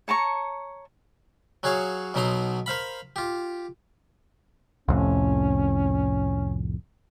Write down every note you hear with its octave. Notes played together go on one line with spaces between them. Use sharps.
C#5 A5 A#5 C#6
F#3 F#4 G#4 C#5 F5
B1 B2 F#3 D#4 A#5 C6
A#4 C5 F5 B5
F4 G4
C2 F2 A2 C#4